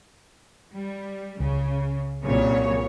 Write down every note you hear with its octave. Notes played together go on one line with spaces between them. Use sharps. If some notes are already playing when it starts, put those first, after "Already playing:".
G3
C#2 C#3
C2 A#2 C#3 F#3 C#5